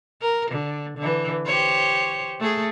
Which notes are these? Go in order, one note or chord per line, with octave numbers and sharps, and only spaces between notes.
A#4
D3
D3 E3
G4 C5 C#5
A3 G#4